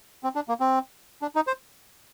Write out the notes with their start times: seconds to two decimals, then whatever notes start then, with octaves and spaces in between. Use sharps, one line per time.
0.24 C4
0.35 D4
0.49 A#3
0.60 C4
1.22 D4
1.36 D#4
1.47 C5